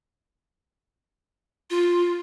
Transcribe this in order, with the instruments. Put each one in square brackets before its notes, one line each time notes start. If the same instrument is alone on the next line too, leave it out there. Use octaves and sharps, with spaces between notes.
[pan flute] F4